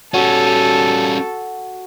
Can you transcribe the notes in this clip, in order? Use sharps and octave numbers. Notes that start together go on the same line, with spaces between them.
G3 C#4 F#4 A4